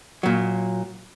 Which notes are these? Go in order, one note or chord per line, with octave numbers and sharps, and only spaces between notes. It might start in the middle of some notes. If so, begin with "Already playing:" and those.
A#2 F#3